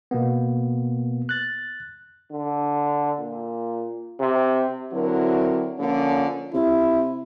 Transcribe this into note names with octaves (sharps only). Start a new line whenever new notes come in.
B2 A#3 B3
F#6 A6
D3
A#2
C3
D3 F#3 C4 E4 F#4 A#4
D3 F3 A#3 C#4
C3 E4